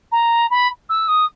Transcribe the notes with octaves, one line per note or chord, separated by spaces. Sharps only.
A#5
B5
E6
D#6